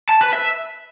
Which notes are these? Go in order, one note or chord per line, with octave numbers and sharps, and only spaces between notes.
A5
B4
E5